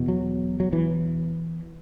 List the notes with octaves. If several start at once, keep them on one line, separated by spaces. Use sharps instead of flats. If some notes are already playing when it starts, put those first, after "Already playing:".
Already playing: E2 B2
F#3
F#3
E3